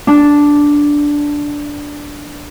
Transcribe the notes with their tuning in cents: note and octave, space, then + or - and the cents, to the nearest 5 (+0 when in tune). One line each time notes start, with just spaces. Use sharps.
D4 -5